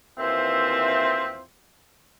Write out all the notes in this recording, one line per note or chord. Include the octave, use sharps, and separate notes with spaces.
D#2 E3 C4 F4 C5 E5